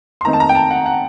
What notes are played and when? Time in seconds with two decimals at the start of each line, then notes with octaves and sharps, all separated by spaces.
0.21 C6
0.25 D#3 A3 C4 D#4 A#5
0.33 A5
0.40 A#5
0.49 G5
0.55 A5
0.71 F#5
0.86 F#5